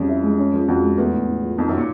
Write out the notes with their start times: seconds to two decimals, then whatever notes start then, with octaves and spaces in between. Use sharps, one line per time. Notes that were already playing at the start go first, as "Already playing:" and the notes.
Already playing: F2 F3 G3 C#4
0.08 E4
0.23 G#3
0.38 C#4
0.54 F3
0.68 F2 F#4
0.83 G#3
0.98 E2 A3
1.13 A2
1.28 A2
1.43 F3
1.57 F2 D#4
1.68 F#2
1.73 A#2 F3